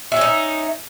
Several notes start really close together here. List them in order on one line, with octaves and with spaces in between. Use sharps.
E5 C#4 D#4